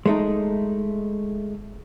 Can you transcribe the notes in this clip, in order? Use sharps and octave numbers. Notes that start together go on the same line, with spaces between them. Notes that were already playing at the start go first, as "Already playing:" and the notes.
G#3 A3 D#4